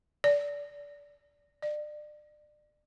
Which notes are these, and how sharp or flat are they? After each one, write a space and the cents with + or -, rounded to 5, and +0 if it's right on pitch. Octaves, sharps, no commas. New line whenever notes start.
D5 -25
D5 +30